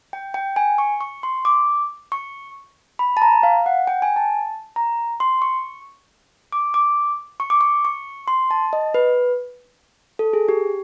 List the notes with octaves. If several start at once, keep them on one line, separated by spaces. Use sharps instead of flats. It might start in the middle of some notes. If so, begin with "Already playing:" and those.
G5
G5
G#5
C#6
C#6
C6
D6
C#6
B5
A5
A#5
F5
F#5
G5
G#5
A5
A#5
C6
C#6
D6
D6
C#6
D6
C#6
C#6
C6
A5
D#5
B4
A4
G#4
G4